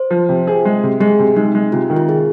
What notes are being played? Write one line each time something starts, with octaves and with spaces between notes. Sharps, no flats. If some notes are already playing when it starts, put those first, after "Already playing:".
Already playing: C5
F3
C3
G#4
G#3
C3
G#3 G#4
C3
G#3 D#4
G#3
C3 F4
D#3
F4
G#4